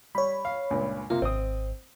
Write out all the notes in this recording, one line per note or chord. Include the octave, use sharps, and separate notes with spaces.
G3 C#5 B5
F5
C#2 G2 A#2
C3 A#3 F4
G#1 C4 D#6